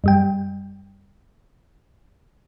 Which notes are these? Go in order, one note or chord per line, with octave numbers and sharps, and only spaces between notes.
F#2 G3 G5